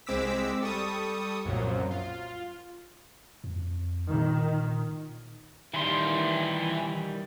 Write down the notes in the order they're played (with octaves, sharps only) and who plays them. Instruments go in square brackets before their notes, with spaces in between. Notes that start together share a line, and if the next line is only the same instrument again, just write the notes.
[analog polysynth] C2 G#3 C4 D6 E6 B6
G3 A4 C#6 D#6
C2 F#2 A#2 F3 F#3
F4
[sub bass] F2
[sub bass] A#2 [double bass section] D#3
[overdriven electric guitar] D#3 G3 [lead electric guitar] E3 C6